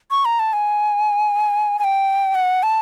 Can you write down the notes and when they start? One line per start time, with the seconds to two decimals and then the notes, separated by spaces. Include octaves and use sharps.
0.11 C#6
0.25 A#5
0.39 A5
0.53 G#5
1.79 G#5
1.84 G5
2.35 F#5
2.63 A5